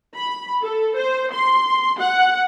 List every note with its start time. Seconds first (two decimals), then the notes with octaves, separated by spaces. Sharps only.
0.15 B5
0.63 A4
0.97 C5
1.33 C6
2.00 F#5